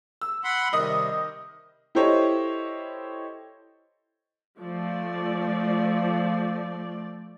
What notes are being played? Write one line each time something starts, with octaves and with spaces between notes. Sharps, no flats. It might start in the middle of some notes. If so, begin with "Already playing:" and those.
E6
F#5 B5 C6
C3 D#3 G3 D#5 D#6
E4 G4 A4 C5 C#5 D#5
F3 A3 D5